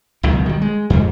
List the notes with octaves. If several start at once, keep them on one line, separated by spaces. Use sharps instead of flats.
F#1 C#2 B2 D#3
D#3 G3
G#3
F2 G#2